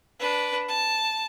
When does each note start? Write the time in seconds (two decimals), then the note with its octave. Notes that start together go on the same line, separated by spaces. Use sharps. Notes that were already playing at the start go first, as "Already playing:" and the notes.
0.19 D4 B4
0.68 A5